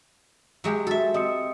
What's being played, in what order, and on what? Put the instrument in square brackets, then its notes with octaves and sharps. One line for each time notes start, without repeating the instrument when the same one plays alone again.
[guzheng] F#3 G#3 G4
[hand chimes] F#4 [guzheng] A4 E5
[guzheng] C4 [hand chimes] D#5 D#6 C#7